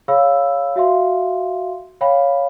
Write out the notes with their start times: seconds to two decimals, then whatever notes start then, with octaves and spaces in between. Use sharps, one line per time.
0.08 G#4 C#5 F5 B5 E6
0.76 F#4 E5 F5 C6
2.01 C#5 F5 G5 B5